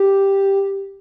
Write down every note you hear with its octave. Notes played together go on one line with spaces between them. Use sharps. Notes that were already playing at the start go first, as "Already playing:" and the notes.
Already playing: G4